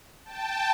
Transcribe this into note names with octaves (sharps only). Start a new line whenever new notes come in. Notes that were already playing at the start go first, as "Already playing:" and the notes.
G5 A5